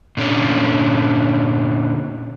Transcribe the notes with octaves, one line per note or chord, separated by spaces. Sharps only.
A#2 D3 C#4